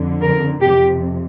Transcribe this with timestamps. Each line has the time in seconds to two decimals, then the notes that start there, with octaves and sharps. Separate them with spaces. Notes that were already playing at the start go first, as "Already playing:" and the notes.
Already playing: F2 D3
0.21 A#4
0.60 F2 C3 G4